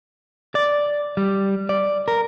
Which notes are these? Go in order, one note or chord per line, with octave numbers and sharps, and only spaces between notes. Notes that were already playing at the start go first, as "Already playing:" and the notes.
D5
G3
D5
A#4